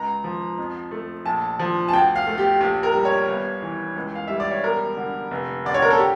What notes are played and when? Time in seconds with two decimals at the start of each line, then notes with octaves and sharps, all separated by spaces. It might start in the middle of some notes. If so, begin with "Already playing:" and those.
Already playing: C#2 A#5
0.24 F3
0.58 F2
0.91 A3
1.25 A#1 A5
1.59 F3
1.88 A5
1.93 D2 G5
2.16 F5
2.27 A3
2.38 G4
2.60 A#1 G4
2.83 A#4
2.94 G3
3.05 C#5
3.28 G1
3.62 E3
3.96 C#2
4.15 F5
4.28 G3 E5
4.40 D5
4.51 C#5
4.64 E1 A#4
4.97 D3
5.31 F1
5.65 D3 D5
5.74 C#5
5.82 A#4
5.90 A4
5.98 G4